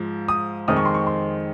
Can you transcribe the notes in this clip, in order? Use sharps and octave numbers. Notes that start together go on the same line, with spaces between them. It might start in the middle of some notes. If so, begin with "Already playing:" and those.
Already playing: G#2 F3
D#6
F2 D#3 G#3 C4 D#6
C#6
C6
C#6
C6